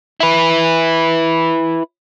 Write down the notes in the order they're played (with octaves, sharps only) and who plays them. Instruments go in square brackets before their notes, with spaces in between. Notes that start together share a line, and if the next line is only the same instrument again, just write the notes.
[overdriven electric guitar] E4 B4